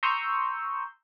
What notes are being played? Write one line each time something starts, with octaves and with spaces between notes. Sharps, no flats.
A#5 C6 C#6 D#6 E6 G6